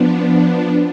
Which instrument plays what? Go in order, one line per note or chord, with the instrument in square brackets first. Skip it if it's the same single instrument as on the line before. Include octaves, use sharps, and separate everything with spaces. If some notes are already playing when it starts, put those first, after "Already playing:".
Already playing: [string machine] F3 B3 D4